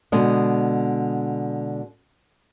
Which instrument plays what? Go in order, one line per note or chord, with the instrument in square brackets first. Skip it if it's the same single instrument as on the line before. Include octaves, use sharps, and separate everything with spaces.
[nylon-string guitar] B2 D3 G#3 D#5